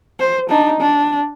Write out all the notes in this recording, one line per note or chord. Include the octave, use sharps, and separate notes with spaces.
C5
D4 D#4
D4